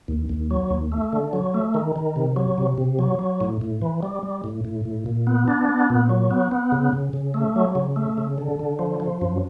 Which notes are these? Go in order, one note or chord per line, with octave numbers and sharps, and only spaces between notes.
D#2
D#2
F#3
D#2
A3
D3
F#3
A3
D#3
D#3
C3
F#3
C3
C3
F#3
F#3
A2
A2
E3
G3
G3
A2
A2
A2
A#2
B3
D4
B3
A#2
F#3
B3
B3
C#3
C#3
C#3
A3
F#3
C#3
A3
C#3
D3
D3
F3
F3
F#2